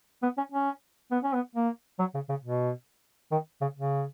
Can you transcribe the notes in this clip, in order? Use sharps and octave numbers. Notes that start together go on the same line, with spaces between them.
B3
C#4
C#4
B3
C#4
B3
A#3
F#3
C#3
C#3
B2
D#3
C#3
C#3